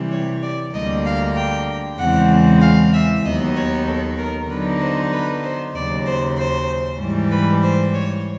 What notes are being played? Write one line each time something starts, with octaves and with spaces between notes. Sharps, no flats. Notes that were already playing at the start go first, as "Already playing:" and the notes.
Already playing: C3 E3 G3
C#5
D5
D2 D3 G3 A#3 D#5
F5
G5
E2 C#3 E3 G#3 C4 F#5
F5
E5
D#2 D#3 F#3 B3 D#5
C#5
A4
A#4
D3 F#3 B3 D#4 B4
C5
B4
C5
D#2 C#3 F#3 D5
C5
C5
G#2 E3 G3
B4
C5
C#5